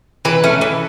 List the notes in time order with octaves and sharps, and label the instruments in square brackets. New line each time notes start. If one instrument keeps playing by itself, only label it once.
[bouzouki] E3 B4
A3 C#4
E3